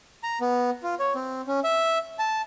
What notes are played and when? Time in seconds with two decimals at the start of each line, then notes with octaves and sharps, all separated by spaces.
0.23 A#5
0.41 B3
0.83 F4
0.99 C#5
1.15 C4
1.47 C#4
1.64 E5
2.19 A5